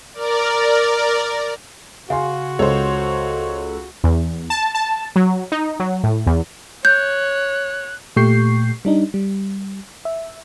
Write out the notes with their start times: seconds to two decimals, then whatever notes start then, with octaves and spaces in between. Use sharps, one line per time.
0.14 A#4 D5
2.10 C#3 F#4 F5 G#5 C6
2.59 C#2 A4 C5 C#5
4.04 E2
4.50 A5
4.75 A5
5.16 F#3
5.52 D#4
5.80 F#3
6.03 A2
6.27 E2
6.85 C#5 F#6 G6
8.16 A#2 A3 G4 C#6 G6 C7
8.85 G3 D4 D#4
9.14 G3
10.05 E5